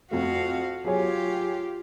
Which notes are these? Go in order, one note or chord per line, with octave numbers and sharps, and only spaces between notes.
F2 A3 F#4 F5
F#3 F4 G4 G#4 C#5